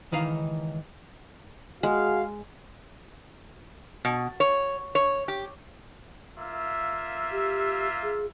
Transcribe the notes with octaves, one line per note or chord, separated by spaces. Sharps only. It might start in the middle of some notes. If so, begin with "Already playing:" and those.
C#2 D#3 E3 D#4 F5
G#3 F#4 G#4 F5
B2
C#5
C#5
G4
A#3 F4 E5
G4
G#4